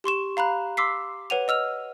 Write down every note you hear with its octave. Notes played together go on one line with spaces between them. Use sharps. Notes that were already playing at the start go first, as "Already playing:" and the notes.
G4 C6 C#6 E7
F5 A#5 B5 F#6
C6 D6 E6 B6 C7
B4 C#5 F#5 D#7 F7
D#5 E6 F6 F7